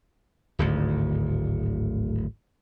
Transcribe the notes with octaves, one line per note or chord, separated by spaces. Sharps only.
D1 G#1 D2